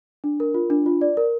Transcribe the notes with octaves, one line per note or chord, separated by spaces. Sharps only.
D4
A#4
F4
D4
F4
D5
A#4